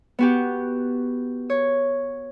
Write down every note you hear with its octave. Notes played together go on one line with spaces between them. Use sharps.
B3 F#4 G4
C#5